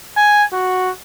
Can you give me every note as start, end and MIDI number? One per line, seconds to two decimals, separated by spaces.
0.16 0.43 80
0.52 0.90 66